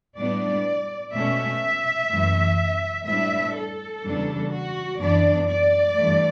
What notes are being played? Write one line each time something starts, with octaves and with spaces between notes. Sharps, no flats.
A2 G3 B3 D4 D5
B2 A3 C#4 E5
F#2 E3 A3
A2 G3 B3 D4 E5
A4
E2 C#3 G3 D4
F#4
F#2 E3 B3 D4 D5
D5
G2 E3 A3